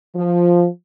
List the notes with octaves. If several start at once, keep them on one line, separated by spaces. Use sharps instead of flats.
F3